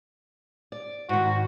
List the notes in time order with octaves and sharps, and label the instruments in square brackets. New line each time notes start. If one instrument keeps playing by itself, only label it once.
[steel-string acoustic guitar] D5
[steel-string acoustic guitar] G#2 D#3 [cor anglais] F#4